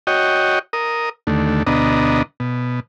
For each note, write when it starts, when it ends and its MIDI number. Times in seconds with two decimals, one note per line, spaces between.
0.07 0.59 66
0.07 0.59 73
0.07 0.59 75
0.07 0.59 79
0.73 1.09 70
0.73 1.09 87
1.27 1.63 39
1.27 1.63 50
1.27 1.63 57
1.67 2.22 38
1.67 2.22 47
1.67 2.22 59
1.67 2.22 62
1.67 2.22 75
1.67 2.22 82
2.40 2.80 47